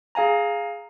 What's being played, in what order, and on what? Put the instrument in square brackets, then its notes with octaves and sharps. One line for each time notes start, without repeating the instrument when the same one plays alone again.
[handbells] G#4 F5 G#5 A#5